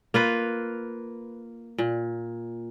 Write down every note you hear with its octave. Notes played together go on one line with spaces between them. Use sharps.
A#3 F4 B4
A#2